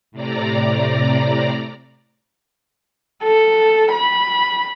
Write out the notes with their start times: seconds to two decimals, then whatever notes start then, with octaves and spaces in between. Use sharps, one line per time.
0.12 A2 C3 D5 A#5
3.23 A4
3.92 B5